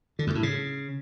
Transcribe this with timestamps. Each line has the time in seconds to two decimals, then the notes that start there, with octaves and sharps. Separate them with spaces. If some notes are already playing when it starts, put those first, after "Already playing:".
0.19 D3
0.27 F#2
0.35 A2
0.43 C#3